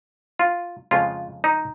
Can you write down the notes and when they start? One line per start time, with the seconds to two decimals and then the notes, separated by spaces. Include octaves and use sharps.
0.39 F4
0.91 F2 C#3 F3 G#3 F4
1.44 D#4